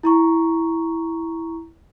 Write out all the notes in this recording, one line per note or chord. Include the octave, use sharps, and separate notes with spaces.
E4 A#5 C#6